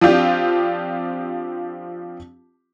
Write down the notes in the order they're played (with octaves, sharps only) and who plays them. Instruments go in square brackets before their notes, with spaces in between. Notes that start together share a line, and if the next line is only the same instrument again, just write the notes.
[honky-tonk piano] F3 C4 D4 F4 G4